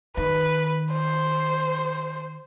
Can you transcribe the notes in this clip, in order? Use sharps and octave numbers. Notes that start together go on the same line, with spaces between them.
D#3 B4
C5